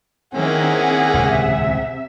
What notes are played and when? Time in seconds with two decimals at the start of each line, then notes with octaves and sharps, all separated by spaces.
0.35 D#3 A#3 C4 C#4 E4 G#4 F#5
1.14 D#1 C#2 A2 C3 E5